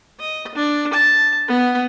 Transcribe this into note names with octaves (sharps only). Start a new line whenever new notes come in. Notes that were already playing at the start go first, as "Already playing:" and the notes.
D#5
D4
A5
B3